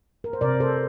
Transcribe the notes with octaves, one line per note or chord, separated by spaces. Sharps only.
A#4
C5
C3 A#4 D5
A4 C5